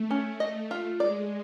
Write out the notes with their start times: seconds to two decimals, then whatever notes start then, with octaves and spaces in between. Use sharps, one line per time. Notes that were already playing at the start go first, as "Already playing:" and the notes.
Already playing: A3
0.11 C#4
0.40 D#5
0.71 F4
0.99 G#3 D5